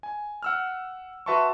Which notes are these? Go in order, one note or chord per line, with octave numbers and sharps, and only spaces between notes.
G#5
F#5 E6 F6
F#4 B4 E5 A5 C6 C#6